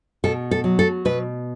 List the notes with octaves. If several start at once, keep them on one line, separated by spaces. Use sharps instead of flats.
B2 A4
A4
F#3
A4
B2 B4